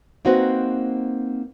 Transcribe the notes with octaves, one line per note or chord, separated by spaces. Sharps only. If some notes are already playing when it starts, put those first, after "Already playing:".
A#3 C4 D#4 F#4 B4 C5